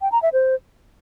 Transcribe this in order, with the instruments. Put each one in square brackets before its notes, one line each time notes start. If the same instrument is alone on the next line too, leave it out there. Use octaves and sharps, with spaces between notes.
[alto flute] G5
A#5
E5
C5